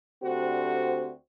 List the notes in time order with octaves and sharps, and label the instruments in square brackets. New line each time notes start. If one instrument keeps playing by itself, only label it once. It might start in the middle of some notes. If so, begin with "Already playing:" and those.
[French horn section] D2 D3 C4 F#4 G4 C5